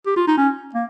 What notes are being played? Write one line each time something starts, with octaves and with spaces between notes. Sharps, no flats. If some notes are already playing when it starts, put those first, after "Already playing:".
G4
F4
D#4
C#4
A#3